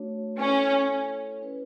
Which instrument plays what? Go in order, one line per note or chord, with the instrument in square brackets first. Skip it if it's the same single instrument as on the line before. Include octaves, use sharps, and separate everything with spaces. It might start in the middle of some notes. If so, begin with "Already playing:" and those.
Already playing: [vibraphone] A3 D4 F#4 C#5
[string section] C#4 [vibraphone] E4 A4 C#5
[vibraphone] C#4 E4 B4